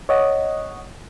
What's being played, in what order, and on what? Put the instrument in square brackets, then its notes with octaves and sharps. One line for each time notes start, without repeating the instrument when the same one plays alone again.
[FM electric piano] C#5 D#5 F#5